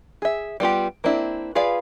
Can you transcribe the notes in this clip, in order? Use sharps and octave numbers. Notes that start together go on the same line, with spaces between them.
G#4 E5
G3 B3 F4 G4
A#3 C4 D4 E4
F4 G#4 B4 D5 F5